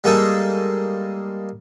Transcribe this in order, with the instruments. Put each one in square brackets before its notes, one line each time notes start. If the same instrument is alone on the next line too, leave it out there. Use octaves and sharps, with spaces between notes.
[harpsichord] G3 G#3 A#3 D#4 G#4 A4